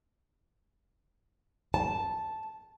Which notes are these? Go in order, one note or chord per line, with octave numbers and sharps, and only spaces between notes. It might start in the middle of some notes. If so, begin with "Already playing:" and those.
A5